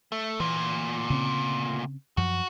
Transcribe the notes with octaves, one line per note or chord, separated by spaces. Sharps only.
A3
D2 A#2 E3
C#3 C4
F#2 F3 F#4